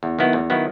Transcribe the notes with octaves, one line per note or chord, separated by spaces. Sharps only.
E2
D#3 F#3 B3 E4
E2
D#3 F#3 B3 E4